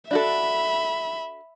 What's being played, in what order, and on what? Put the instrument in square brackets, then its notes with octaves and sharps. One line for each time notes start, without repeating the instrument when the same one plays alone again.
[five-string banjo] D4 F#4 A4 [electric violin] E5 B5